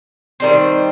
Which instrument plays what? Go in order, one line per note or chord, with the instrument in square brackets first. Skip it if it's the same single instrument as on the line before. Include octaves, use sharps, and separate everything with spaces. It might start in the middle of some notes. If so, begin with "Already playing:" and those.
[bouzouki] D#3 G3 C4